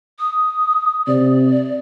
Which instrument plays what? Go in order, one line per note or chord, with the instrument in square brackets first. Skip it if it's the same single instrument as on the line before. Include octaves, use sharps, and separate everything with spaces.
[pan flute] D#6
[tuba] C3 [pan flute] D5